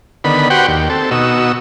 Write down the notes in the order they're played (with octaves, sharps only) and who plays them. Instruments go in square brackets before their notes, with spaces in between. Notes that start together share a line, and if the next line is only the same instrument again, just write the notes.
[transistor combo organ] D3 D#3 B3 B5
F#4 G4 B4 C5 F#5 G5
D#2 G4
C4 A4
B2 D#4 F#4 E6